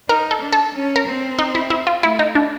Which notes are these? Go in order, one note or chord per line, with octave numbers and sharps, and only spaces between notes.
D#4 A#4
A4
D4
A4
C#4
A#4
C4
D#4
E4
E4
F4
A3 E4
D#4
D4